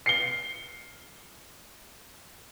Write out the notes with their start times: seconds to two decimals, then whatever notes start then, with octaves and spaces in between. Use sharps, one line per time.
0.06 C7 C#7 G7